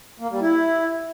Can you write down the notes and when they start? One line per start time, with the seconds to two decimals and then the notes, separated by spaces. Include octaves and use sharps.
0.20 A#3
0.30 G3
0.41 E4